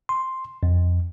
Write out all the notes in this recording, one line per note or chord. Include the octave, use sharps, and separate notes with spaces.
C6
F2